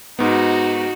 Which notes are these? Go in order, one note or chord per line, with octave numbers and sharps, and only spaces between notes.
G#2 B3 D#4 F#4